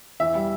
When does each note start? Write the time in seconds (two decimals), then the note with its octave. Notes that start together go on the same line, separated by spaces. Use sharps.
0.20 E2 E5
0.35 G3